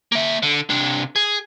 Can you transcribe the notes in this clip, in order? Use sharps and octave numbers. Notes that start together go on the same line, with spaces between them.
A#3 E5
D3
C3 D4
G#4